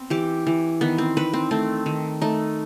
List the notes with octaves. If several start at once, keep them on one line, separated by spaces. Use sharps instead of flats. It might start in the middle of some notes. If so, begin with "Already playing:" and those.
Already playing: B3 C4
E3 G4
E3
D#3 B3
C4
D#3 B4
C4
A3 C4
D#3
A3 D#4